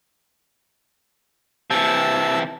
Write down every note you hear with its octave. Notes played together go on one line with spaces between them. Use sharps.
C3 E3 A5 E6